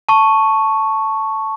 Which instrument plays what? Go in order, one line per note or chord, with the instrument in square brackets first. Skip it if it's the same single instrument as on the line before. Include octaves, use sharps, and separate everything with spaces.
[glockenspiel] A5 C#6